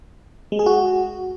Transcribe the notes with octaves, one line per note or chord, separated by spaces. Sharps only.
G#3
G#4
F#4